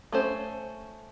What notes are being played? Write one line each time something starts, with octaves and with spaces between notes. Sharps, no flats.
A3 C#4 C5